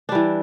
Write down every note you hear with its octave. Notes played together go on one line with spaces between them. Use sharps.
E3 G3 D4